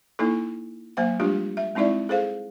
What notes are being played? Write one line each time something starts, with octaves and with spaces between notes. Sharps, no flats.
A#3 D#4 E4 A4
F#3 A#3 C5 F#5
G3 G#3 D4 F4 G4
E5
G#3 C4 D#4 E4 D5 E5
G#4 A4 C5 F5